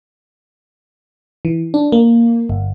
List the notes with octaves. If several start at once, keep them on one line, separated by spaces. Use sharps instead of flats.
E3
D4
A#3
G1